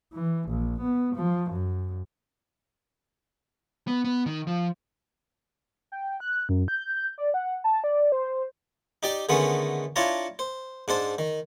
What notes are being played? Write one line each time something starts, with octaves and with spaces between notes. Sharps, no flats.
E3
A#1
B3
F3
F#2
B3
B3
D#3
F3
G5
F#6
F#2
G6
D5
F#5
A5
D5
C5
D#4 G4 D5 G5
D3 D#3 G#3 A3 B3 C#4
D4 E4 F4 C#5 A5 A#5
C5
G#2 D4 C5 A5
D#3